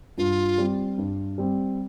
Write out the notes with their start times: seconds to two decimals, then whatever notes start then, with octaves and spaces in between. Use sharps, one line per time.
0.18 G2 F4
0.58 G3 C4
0.98 G2
1.38 G3 C4